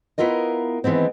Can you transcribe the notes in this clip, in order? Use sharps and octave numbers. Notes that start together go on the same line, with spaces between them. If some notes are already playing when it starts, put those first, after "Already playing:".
B3 E4 F4 A#4 D#5
D#3 E3 G#3 B3 C4